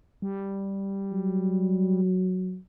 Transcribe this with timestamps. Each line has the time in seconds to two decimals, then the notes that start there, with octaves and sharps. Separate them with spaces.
0.22 G3
1.12 F#3